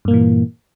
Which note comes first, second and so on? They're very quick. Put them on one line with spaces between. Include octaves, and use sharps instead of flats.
G2 A#3 A#2 E3